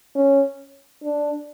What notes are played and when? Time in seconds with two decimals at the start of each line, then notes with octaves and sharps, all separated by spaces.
0.15 C#4
1.03 D4